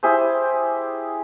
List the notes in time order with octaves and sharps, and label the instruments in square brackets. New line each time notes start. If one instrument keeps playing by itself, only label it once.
[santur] E4 G4 G#4 C5